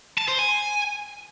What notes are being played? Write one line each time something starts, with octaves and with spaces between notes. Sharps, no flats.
A5
C5
G#5